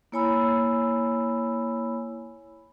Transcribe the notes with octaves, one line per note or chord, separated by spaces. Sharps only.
A#3 E4 C#5 G#5 B5 E6